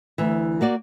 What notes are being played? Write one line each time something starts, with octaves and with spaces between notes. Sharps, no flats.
D2 E3
A#3 F#4 D5